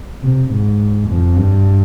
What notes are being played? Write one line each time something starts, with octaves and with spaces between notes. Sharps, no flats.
C3
G#2
F2
G2